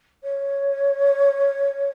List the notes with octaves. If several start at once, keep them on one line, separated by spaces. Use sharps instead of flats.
C#5